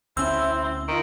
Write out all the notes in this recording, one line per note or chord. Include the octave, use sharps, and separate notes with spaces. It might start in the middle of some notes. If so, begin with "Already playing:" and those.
D2 C4 C#4 E4 E6
D#3 F4